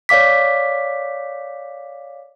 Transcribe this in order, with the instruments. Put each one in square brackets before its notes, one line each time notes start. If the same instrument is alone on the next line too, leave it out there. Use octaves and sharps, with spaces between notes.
[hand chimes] C#5 D5 F5 D6 B6